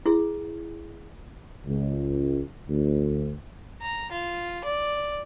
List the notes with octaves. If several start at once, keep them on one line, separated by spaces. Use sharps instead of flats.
E4 G#4
C#2
D2
A#5
F4
D5